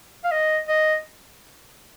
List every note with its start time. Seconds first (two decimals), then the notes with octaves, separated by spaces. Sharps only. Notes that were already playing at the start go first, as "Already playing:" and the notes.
0.24 F5
0.31 D#5
0.69 D#5